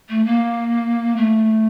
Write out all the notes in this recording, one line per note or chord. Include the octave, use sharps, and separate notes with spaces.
A3
A#3
A3